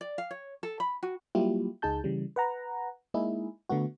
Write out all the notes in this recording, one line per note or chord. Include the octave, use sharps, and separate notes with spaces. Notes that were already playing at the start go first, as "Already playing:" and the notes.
D5
F5
C#5
A4
B5
F#4
F#3 G3 A#3 E4 F4 G4
C#2 D#4 G#4 A5 G6
C#3 E3 G3
B4 F#5 A#5
G#3 A#3 D#4 E4 G#4
D3 A3 B3 F#4